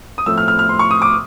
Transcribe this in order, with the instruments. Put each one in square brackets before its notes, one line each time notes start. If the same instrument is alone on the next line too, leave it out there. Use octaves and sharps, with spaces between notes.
[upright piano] D#6
A2 F3 A3 C4 E6
F6
F6
F6
C6
C#6
D#6
D6